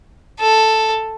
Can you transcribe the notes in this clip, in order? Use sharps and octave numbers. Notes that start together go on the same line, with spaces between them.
A4